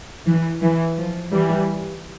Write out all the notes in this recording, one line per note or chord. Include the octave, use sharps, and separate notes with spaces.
E3
E3
F3
E3 G3